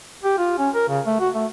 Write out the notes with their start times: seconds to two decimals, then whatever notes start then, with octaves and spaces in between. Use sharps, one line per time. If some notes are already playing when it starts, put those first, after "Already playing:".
0.23 G4
0.38 F4
0.58 C#4
0.74 A#4
0.88 C#3
1.06 A3
1.20 F#4
1.35 A3